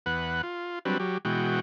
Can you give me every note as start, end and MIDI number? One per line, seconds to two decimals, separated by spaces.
0.06 0.42 40
0.06 0.42 71
0.06 0.42 78
0.43 0.79 65
0.85 0.98 54
0.85 0.98 55
0.85 0.98 60
0.85 0.98 62
0.85 0.98 71
1.00 1.18 54
1.00 1.18 67
1.25 1.60 47
1.25 1.60 52
1.25 1.60 56
1.25 1.60 66
1.25 1.60 79